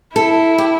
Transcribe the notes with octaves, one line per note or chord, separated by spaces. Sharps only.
E4 A4
G4